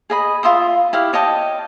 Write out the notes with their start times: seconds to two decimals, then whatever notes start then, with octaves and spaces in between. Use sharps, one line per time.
0.10 G#4 D#5 B5
0.43 F4 E5 C6 D#6
0.93 E4 G4 F5
1.13 C#5 D#5 G5 A5